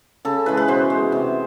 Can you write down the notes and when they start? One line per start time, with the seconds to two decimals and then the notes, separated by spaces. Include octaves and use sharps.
0.25 C#3 A4
0.46 E3 G#3 B4
0.57 B4
0.68 B2 C5
0.90 G#3
1.12 C3